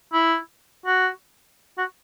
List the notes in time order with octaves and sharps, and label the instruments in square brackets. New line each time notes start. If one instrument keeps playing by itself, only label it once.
[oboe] E4
F#4
F#4